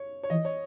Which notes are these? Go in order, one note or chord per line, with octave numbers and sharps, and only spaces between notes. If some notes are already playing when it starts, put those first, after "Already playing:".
Already playing: C#5
C#5
E3 D#5
C#5